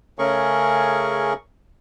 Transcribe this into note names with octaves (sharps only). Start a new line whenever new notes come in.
C#3 A3 C#4 G#4 A#4 C#6